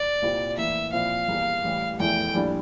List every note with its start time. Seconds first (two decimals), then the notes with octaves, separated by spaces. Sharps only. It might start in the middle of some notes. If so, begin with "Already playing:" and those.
Already playing: D5
0.22 C2 A#2 G3 C4
0.57 A2 E3 A#3 E5
0.93 A#2 F3 C4 E4 F5
1.28 E2 E3 G3 A#3
1.64 A1 A2 E3 G3
1.99 F1 E2 E3 A3 G5
2.34 A#1 A2 G3 D4